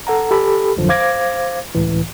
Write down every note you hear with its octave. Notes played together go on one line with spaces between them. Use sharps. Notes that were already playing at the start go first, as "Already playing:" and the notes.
A4 F#5 A#5
G4 A4 B5
G#1 F2 D3 F3 F#3
C5 F5 D6 G#6 A#6
C#2 A2 E3